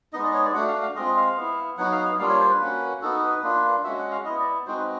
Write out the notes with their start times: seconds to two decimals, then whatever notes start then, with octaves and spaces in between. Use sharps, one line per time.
0.13 G#3 B3 D#4 D#5
0.24 D5
0.34 C#5
0.45 D5
0.54 A3 D4 F#4 F#5
0.68 F5
0.82 F5
0.95 G#3 C4 F4 D#5
1.17 F5
1.37 B3 E4
1.78 F#3 B3 D#4 F#4 F#5
1.92 F5
2.05 F5
2.19 G3 A#3 D4 F4 F5
2.30 C#5
2.39 C5
2.50 B4
2.61 A#3 C#4 F#4
3.02 B3 D#4 F#4 A4
3.23 B4
3.43 A#3 D4 F4
3.84 G#3 C#4 F#4 E5
3.98 F#5
4.11 F5
4.25 B3 E4 D#5
4.39 D5
4.66 G#3 C4 D#4 F#4 C5
4.77 B4